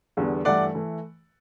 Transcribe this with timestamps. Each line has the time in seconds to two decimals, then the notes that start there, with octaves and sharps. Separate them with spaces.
0.17 E2 D3 G3 B3
0.45 G2 E3 A3 D5 F#5
0.75 E3 A3